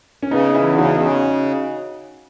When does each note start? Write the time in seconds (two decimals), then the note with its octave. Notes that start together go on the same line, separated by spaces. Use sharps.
0.23 C#4
0.31 C#3 B3 D#4
0.54 E2 C#4 E4
0.77 C#3 D#4 F#4
1.00 C#3